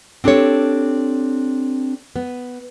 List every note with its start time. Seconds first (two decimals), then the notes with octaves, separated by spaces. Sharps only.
0.24 C4 D4 G4 A4 C#5
2.16 B3